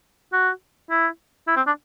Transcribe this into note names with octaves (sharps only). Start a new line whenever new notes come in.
F#4
E4
E4
C4
D4